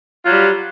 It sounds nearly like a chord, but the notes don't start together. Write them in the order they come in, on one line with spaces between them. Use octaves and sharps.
F4 F#3 G3